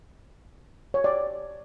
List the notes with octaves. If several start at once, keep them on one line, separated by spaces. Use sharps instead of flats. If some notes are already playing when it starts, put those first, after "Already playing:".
C#5
D5